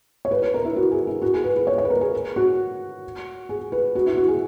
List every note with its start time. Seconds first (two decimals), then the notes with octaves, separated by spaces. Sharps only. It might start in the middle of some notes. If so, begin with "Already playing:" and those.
0.25 C#5
0.31 B4
0.42 B4
0.54 A#4
0.65 E4
0.76 F#4
0.91 G#4
1.07 E4
1.22 F#4
1.34 G#4
1.44 B4
1.56 B4
1.67 C#5
1.78 C#5
1.85 B4
1.90 A#4
2.01 G#4
2.36 F#4
3.49 G#4
3.72 B4
3.95 F#4
4.06 E4
4.17 F#4
4.28 G#4